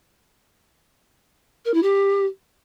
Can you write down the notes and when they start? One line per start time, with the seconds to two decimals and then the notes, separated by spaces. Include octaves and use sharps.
1.65 A#4
1.74 E4
1.82 G4